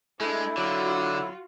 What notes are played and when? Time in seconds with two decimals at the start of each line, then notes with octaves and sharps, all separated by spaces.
0.20 G#3 A3 D4 E4
0.57 D3 F#3 F4 F#4